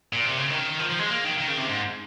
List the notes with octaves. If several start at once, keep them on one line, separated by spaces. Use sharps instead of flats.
A#2
C3
C#3
D#3
F3
F3
G#3
A#3
D#3
D#3
C#3
C3
G#2